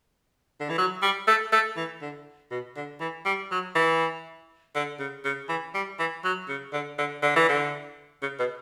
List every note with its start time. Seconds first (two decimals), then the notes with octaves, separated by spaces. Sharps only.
0.60 D3
0.69 E3
0.78 F#3
1.02 G3
1.27 A3
1.53 A3
1.76 E3
2.02 D3
2.51 B2
2.76 D3
3.00 E3
3.25 G3
3.51 F#3
3.75 E3
4.75 D3
4.99 C#3
5.25 C#3
5.49 E3
5.75 G3
5.99 E3
6.24 F#3
6.49 C#3
6.73 D3
6.98 D3
7.22 D3
7.36 E3
7.49 D3
8.22 C#3
8.39 B2